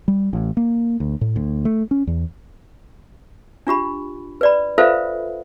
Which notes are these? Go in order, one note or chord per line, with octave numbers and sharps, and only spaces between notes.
G3
A1
A#3
D2
A2
D2
A3
C#4
E2
D4 F4 G4 B5
B4 D5 B5
F4 A4 B4 C5 E5 F5